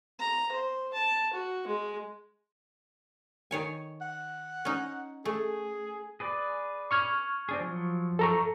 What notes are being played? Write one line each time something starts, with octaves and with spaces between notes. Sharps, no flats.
A#5
C5
A5
F#4
G#3
D#3 C#5 G#5
F#5
C#4 D#4
A3 G#4
G#4 B4 D5
C#6 F6 G#6
C4 D4 G#4
F3 F#3
A4 A#5 C#6